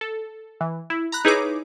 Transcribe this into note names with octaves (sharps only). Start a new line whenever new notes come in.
A4
E3
E4
A#5 B5 F#6
D#4 E4 G#4 B4 C#5 D6